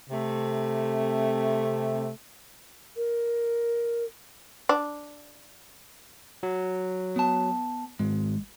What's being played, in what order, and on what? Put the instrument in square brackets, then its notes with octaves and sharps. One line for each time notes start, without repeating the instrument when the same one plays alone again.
[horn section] C3 A3
[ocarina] A#4
[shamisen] D4
[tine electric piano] F#3
[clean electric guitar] B3 A5
[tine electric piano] G#1 [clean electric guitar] G#3